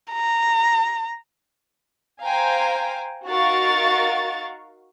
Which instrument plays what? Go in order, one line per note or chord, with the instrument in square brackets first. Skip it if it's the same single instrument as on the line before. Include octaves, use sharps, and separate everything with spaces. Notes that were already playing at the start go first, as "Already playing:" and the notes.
[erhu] A#5
[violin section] C5 F5 G5 G#5 A#5
D#4 F#4 A#4 F5 C#6 A6